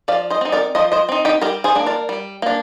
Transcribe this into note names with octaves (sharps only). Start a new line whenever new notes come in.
F3 D5 F5
C5 D#5
C4 D#4
A#4 D5
F3 C5 D#5
C5 D#5
C4 D#4
D#4 G4
G3 G4 A#4
G#4 C5
A#3 D4
A#4 D5
G3
A#3 D4